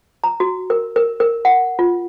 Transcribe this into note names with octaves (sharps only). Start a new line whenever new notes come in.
A#5
F#4
A#4
A#4
A#4
F#5
F4